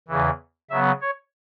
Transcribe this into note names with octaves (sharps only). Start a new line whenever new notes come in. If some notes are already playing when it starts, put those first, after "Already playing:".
E2 C#3 E3
C#3 F#3 B3 E5
C#5